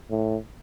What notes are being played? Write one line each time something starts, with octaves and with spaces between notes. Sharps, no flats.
A2